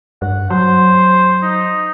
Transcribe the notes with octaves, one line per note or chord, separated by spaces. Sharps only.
G2 F#5
F#3 C5
D#4